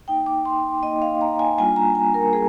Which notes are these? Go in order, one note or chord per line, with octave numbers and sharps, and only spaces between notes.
A#3 D#4 G5
D6
C6
A#3 D#4 D#5
F5
A#5
G#5
G3 A#3 D4 F4 G#5
A#5
G#5
A#4
G3 A#3 G#4